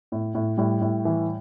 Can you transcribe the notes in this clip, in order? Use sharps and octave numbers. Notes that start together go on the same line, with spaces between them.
A2
A2
A2 G3
A2
E3